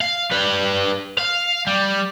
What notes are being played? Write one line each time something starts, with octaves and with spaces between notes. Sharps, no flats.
F5
G3 B4
F5
G3